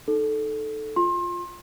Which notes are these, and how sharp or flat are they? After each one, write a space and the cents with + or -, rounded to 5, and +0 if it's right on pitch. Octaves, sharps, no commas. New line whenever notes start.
D#4 +0 A4 -10
F4 +0 C6 +30